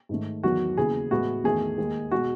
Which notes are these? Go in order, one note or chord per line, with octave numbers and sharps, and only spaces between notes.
G#2 D#3 A3
E2 D#3 F#3 F#4
D#2 C#3 E3 B3 G#4
A2 E3 G#3 B3 F#4
E2 D#3 A3 G#4
D#2 D#3 G#3
B2 G#3 F#4